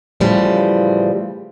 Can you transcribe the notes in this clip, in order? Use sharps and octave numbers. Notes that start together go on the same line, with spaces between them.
A2 C#3 E3 F3 G3